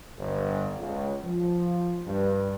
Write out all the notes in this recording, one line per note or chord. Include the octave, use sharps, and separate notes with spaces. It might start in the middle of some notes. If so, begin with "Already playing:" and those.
G1
C#2
F3
G2